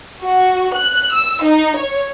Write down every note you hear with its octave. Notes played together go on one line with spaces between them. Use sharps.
F#4
F#6
E6
D#4
C#5